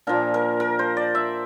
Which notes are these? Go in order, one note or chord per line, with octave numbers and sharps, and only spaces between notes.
A#2 F3 A#3 D4 A#4
A#4
A#4
C5
D5
E5